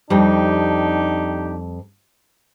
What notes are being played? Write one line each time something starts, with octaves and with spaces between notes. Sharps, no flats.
F2 G3 D4 D#4 G4